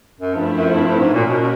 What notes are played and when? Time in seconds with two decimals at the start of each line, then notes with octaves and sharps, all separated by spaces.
0.20 F#2
0.34 G2 F3 A3 C4 E4
0.54 F#2
0.74 G2
0.87 G2
1.00 G#2
1.13 A#2 A#3 C#4 F#4 A#4
1.27 B2
1.40 B2